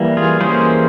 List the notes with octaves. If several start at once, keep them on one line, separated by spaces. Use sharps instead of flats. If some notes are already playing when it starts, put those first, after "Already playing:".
Already playing: E3 G3 A#3
F4 G#4
E3 G3 A#3 C#4 G#4 C5